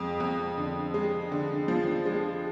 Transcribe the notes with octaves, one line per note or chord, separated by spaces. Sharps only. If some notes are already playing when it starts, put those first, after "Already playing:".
Already playing: F2 G#3
F2
D3
G#3
D3
F3
G#3